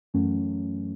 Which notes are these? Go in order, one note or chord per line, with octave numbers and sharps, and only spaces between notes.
F#2 E3 F#3 A3 C#4